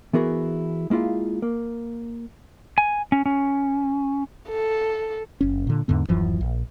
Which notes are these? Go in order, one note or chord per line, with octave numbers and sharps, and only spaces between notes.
E3 B3 E4 F#4 G#4 A#4
G#3 A#3 E4 F4 G#4
A#3
G#5
C#4
C#4
A4
F#1 C#4
A#2 D3
E2 G#2 D3 B3
D1 F#2 E3 F3
A#1